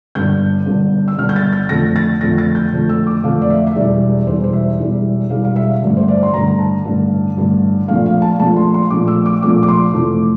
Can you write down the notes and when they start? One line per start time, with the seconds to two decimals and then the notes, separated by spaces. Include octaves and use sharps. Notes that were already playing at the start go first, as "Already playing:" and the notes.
0.15 G1 G2 D3 G6
0.66 G1 G2 D3
1.08 E6
1.18 G1 G2 D3 F6
1.29 G6
1.36 A6
1.52 A6
1.69 F2 D3 A3 A#6
1.96 A6
2.21 F2 D3 A3 A#6
2.38 A6
2.55 G6
2.73 F2 D3 A3
2.89 E6
3.07 D6
3.24 F2 D3 A3 F5
3.42 D5
3.50 E5
3.67 E5
3.75 E1 E2 E3 G3 D5
4.27 E1 E2 E3 G3 C5
4.44 C5
4.53 E5
4.79 E1 E2 E3 G3
5.30 E1 E2 E3 G3 F5
5.45 F5
5.56 E5
5.82 A1 G2 D3
5.97 C5
6.08 D5
6.23 C6
6.34 A1 G2 D3 A#5
6.59 A5
6.85 A1 G2 D3
7.37 A1 G2 D3
7.88 A#1 A#2 F3 A3 F5
8.06 F5
8.22 A5
8.40 A#1 A#2 F3 A3 A5
8.57 C6
8.74 C6
8.90 A#1 A#2 F3 A3 D6
9.08 E6
9.26 D6
9.42 A#1 A#2 F3 A3 D6
9.63 D6
9.68 C6
9.94 F1 F2 E3 A3